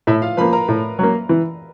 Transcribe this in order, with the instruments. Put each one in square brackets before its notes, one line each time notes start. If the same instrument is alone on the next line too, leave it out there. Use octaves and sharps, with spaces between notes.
[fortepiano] A2 [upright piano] E4 E5
[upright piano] F4 F5
[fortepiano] F3 [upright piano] B4 B5
[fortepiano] A#3
[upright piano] A#4 A#5
[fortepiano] A2
F#3 A#3
E3